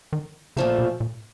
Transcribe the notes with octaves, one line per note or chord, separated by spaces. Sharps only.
D#3
A#2 C#3 F3 A3
B2
A#2